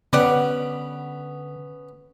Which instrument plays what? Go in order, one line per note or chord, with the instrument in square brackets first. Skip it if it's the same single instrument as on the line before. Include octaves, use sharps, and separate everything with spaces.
[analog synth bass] D3 [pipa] G3 D5 F#5 [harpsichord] B3 C#4